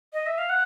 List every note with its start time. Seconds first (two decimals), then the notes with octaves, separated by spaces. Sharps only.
0.13 D#5
0.27 E5
0.38 F5
0.49 F#5